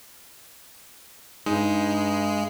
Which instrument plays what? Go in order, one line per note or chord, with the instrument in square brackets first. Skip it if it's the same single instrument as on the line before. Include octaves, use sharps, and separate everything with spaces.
[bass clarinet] G2 [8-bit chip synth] G#3 [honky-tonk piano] D#4